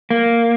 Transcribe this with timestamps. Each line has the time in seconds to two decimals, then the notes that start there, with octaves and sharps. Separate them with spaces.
0.11 A#3